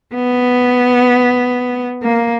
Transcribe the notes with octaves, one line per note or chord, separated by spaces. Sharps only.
B3
A#3